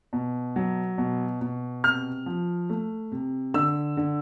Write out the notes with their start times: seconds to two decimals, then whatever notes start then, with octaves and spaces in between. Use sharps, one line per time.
0.13 B2
0.56 F#3
0.98 B2
1.41 B2
1.84 C3 F6
2.26 F3
2.70 A3
3.12 C3
3.54 D3 E6
3.97 D3